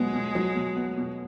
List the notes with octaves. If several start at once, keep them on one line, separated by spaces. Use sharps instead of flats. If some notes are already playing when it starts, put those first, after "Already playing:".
Already playing: B2 F#3 G#3 B3
B2
F#3
B2
B3
B2